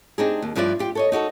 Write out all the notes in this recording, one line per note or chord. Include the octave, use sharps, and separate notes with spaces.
C4 D4 D#4 G4 G#4
D#2
G2 F3 E4 B4 D5
F4 G4
A4 C#5 D#5
D#4 F#4 G4 A4